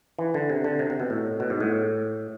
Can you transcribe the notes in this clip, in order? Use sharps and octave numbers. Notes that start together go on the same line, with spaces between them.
E3
D3
C3
D3
C3
C3
B2
A2
B2
G#2
A2